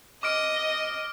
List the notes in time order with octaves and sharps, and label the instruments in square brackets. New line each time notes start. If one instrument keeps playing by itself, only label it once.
[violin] D#5 [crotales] D6 F6 D7